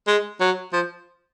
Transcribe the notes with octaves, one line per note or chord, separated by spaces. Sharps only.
G#3
F#3
F3